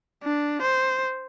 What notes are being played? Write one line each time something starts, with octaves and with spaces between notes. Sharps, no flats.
D4
C5